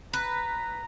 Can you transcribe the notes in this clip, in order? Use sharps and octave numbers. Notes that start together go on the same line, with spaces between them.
B4 A#5